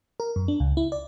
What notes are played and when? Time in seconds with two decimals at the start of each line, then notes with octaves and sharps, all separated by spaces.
0.20 A#4
0.36 F#2
0.48 D4
0.60 C#2
0.77 E4
0.92 D5